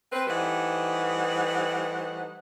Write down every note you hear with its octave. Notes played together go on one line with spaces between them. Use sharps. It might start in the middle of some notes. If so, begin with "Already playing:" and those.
C4 B4
E3 G3 A3 D#4 C5 F#5